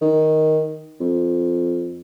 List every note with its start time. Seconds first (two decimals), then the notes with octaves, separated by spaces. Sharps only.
0.01 D#3
1.00 F2